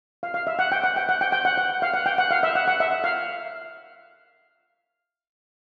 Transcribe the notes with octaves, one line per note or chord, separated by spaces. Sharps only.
F5
F5
E5
F#5
G5
F#5
G5
F#5
G5
G5
F#5
F#5
F5
F#5
G5
F#5
F5
E5
F#5
F#5
E5
F5